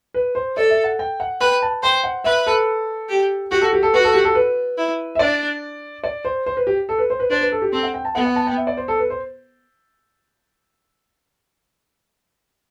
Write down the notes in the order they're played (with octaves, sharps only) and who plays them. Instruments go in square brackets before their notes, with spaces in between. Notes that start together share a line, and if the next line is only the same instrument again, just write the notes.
[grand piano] B4
C5
[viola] A4 [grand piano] D5
[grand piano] E5
F#5
G5
F#5
[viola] B4 [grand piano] G5
[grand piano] A5
[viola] C5 [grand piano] G5
[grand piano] F#5
[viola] B4 [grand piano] E5
[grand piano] A4
[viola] G4
[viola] F#4 [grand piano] G4
[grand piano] A4
G4
A4
[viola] F#4 [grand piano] B4
[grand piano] A4
G4
A4
B4
[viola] E4
[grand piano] E5
[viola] D4 [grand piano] D5
[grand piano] D5
C5
C5
B4
G4
A4
B4
C5
B4
[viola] D4 [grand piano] C5
[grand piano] B4
A4
G4
[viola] C4 [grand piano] A4
[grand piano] F#5
G5
A5
[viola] B3 [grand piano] F#5
[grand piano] F#5
A5
G5
E5
D5
C5
A4
B4
C5